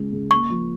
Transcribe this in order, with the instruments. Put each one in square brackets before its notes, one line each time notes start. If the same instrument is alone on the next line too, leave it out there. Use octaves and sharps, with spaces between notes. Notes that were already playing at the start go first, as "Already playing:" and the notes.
Already playing: [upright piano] C#2 C#3
C#3
[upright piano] A#3 [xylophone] C#6
[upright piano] F3